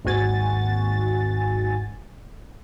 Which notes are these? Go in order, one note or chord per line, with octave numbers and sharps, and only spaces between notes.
G#1 D#2 G#2 F#4 G#5 A6